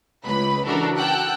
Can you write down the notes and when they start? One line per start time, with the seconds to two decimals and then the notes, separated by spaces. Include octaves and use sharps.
0.24 C#2 B4 B5
0.65 C#3 E3 D4 F#4 A4 A#4
0.97 F#5 G5 A5 E6 F#6